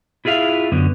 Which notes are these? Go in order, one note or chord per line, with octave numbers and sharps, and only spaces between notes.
E4 F4 G#4 E5 F5
F#2 D3 B3